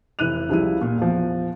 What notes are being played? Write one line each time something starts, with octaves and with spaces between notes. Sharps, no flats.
F1 E3 E4 F#6 D#7 F7
C#2 F3 G3 E4 D#7
A#2
E2 F3